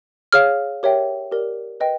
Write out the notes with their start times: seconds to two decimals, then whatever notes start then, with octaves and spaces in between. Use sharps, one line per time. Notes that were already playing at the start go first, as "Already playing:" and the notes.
0.33 G#4 C#5 F5 F6
0.83 G4 A#4 C#5 E5 G5
1.31 G4 A#4 D5
1.80 B4 D#5 G5